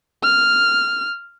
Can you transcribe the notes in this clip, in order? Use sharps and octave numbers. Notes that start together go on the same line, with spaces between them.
F6